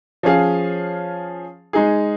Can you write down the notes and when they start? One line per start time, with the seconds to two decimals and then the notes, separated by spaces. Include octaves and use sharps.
0.23 F3 C#4 G#4 F5
1.73 G#3 D#4 G#4